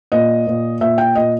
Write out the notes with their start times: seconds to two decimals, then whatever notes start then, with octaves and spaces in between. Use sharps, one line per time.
0.12 A#2 D#5
0.47 A#2
0.81 A#2 E5
0.98 G5
1.15 A#2 D#5